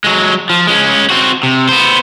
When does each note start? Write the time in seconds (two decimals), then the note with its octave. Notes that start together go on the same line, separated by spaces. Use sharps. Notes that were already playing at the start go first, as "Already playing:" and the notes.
0.04 F#3 G#3
0.50 F3
0.67 G#3 C#4
1.10 C4 F#4
1.43 C3
1.69 B3 C5